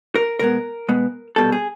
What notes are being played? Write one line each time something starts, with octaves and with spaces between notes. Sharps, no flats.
A#4
B2 G#3 B3 A#4
B2 G#3 B3
C2 B2 G3 A4
G#4